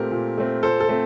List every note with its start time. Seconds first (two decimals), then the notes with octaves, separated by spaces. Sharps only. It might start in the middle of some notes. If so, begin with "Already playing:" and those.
Already playing: A#2 A3 C4 G4 A#4
0.11 A#2
0.38 A3 C4
0.63 A#2 A4 C5
0.80 A4
0.89 A3 C4